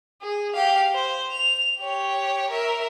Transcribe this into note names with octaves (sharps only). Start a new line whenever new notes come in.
G#4
G4 F5
C5
F7
G4 C#5
A#4 E5